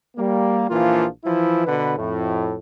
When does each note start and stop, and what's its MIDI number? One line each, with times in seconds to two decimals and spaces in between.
0.17 0.65 55
0.17 0.65 58
0.70 1.06 34
0.70 1.06 52
0.70 1.06 53
0.70 1.06 58
0.70 1.06 65
1.24 1.64 52
1.24 1.64 53
1.24 1.64 64
1.66 1.94 47
1.66 1.94 50
1.66 1.94 71
1.97 2.57 41
1.97 2.57 45